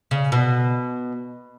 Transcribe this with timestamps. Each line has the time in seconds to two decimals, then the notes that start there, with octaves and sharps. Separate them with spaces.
0.11 C#3
0.32 B2